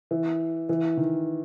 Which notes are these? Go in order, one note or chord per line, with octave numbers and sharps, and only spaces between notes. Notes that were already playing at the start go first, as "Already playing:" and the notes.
E3
E3
D#3